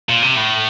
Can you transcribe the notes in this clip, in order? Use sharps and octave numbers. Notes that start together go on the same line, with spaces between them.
A#2
C3
A2